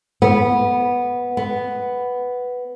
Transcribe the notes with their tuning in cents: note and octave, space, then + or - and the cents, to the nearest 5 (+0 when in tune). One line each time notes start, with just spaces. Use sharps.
B3 -10
B3 +5